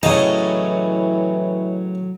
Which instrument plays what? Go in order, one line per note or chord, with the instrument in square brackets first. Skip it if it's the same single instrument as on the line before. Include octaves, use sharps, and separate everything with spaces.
[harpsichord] A2 C#3 A5 [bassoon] E3 [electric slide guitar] F#3 A#5 [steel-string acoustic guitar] D#5